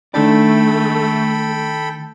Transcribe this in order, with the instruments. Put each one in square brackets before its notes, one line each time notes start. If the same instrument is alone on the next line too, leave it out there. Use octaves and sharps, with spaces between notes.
[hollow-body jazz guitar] D#3 D4 D5 [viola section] A3 [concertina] A4 G5 B5